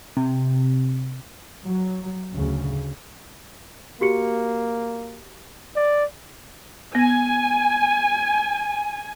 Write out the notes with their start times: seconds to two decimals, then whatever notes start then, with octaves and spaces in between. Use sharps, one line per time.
0.17 C3
1.65 F#3
2.33 D2 C#3
4.01 A#3 F#4 G4 C#7
5.76 D5
6.95 B3 G#5